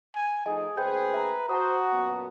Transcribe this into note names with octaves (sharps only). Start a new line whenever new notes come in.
G#5
F3 A3 D#4 G#4 D#5 G#5
D2 A#3 G#4 B4 C5 G5 G6
E5 A#5
F#4 C5 A5 A#5 D#6
F#2 A#2 B3